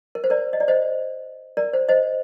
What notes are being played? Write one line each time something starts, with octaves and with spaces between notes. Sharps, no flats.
A#4
C5
A#4 D5
D#5
D5
C5 D#5
A#4 D5
C5
C5 D#5